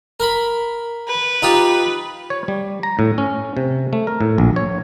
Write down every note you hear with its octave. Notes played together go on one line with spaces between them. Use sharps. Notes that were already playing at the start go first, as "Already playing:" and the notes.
A#4 B5
B4
D#4 F4 G4
C#5
G3
A#5
A2
C#4
C3
A3
A#4
A2
A#1
C#5